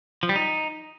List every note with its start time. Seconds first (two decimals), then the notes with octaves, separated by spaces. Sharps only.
0.23 F3
0.29 G3
0.36 D#4